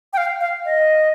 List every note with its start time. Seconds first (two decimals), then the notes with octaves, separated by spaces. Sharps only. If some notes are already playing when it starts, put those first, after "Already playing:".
0.13 G5
0.17 F5
0.41 F5
0.65 D#5